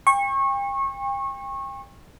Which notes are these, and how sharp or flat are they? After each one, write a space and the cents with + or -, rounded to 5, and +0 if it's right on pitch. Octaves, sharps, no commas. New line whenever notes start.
G5 +35 C#6 -25